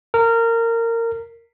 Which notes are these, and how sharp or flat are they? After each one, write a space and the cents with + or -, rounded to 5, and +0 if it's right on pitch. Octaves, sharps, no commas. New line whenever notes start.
A#4 -20